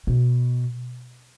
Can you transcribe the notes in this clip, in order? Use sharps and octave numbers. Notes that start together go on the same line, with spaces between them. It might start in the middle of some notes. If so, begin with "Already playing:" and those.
B2